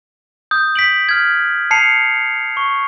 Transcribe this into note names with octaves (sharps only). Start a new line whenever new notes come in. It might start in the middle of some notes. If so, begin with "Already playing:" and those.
D#6 G6
B6 D7 F#7
F6 G#6
A5 C7 C#7 F7
C#6